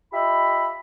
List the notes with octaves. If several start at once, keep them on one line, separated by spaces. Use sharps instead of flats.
F4 G4 D#5 E5 B5